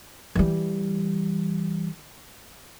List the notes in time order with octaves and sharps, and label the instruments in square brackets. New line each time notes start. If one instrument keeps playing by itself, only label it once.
[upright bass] E3 G3